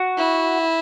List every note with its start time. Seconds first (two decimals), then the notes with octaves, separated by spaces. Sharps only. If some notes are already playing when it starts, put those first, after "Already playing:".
Already playing: F#4
0.18 E4